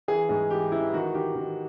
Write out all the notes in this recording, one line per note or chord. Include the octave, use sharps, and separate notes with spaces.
E3 G#4
G#2 G#4
E3 G4
E3 E4
D#3 F#4
D#3 G4
D#3